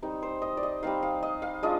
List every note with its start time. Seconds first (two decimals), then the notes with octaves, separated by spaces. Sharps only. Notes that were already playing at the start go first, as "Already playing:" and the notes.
0.02 G3 C4 D#4
0.22 C5
0.42 D#5
0.57 D5
0.63 D#5
0.82 G3 C4 D#4 F5
1.03 F5
1.23 D#5
1.42 F5
1.63 G#3 D4 F4 D#5